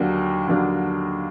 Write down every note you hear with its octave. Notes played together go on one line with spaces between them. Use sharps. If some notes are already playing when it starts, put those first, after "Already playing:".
Already playing: D#2 D3 F#3 A#3 D4
D#2 D3 F#3 A#3 D4